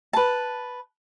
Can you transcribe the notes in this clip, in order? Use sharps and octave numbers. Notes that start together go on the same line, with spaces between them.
B4 A5